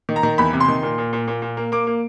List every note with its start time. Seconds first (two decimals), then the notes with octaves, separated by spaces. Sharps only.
0.09 D#3
0.16 A#5
0.23 D#3
0.38 E2 B5
0.53 C3
0.60 C6
0.68 D#3
0.83 A#2
0.98 A#2
1.13 A#2
1.28 A#2
1.42 A#2
1.57 A#3
1.72 A#3 D6
1.87 A#3